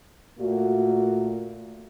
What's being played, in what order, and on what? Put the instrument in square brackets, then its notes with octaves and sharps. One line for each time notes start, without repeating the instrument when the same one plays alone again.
[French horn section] A#2 A3 A#3 F#4